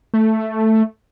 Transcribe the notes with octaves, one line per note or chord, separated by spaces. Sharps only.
A3